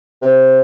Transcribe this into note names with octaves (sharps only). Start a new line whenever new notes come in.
C3